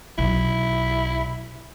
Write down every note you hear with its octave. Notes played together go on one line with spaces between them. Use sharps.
B1 E4